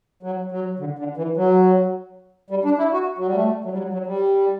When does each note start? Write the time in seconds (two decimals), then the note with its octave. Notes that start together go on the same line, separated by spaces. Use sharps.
0.23 F#3
0.52 F#3
0.79 D3
0.99 D3
1.17 E3
1.37 F#3
2.50 G3
2.65 D4
2.78 E4
2.93 F#4
3.18 F#3
3.27 G3
3.35 A3
3.65 F#3
3.73 G3
3.78 F#3
3.93 F#3
4.07 G3